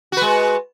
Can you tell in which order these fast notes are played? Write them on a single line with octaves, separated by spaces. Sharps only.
F#4 B4 G#3